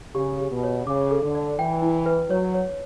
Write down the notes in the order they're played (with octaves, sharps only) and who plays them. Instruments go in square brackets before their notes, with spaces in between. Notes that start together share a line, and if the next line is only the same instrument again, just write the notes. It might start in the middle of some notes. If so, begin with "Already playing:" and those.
[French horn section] C#3 [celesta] G4
[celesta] G4
[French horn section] B2
[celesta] C#5
[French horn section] C#3 [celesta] D6
[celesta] A4
[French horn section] D3
[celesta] D5
[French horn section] E3 [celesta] G5
[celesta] E4
B4
[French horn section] F#3 [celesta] C#5
[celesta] C#5